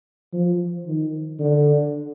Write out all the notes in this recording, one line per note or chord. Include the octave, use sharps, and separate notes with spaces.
F3
D#3
D3